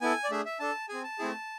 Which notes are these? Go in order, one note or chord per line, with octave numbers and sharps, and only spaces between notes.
B3 E4 A4 G#5
D5
A3 D4 G#4 E5
E5
D4 A4 A5
C4 G#4 G#5
A5
A3 C4 E4 G#4